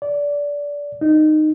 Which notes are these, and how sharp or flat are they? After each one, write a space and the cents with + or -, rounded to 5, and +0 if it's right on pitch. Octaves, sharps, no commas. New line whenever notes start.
D5 -20
D#4 -15